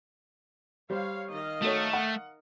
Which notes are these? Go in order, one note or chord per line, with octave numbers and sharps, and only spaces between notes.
G3 C5 C#5 F5
D#3 D#5 F5
A3 F#4 A4 C#5
F#5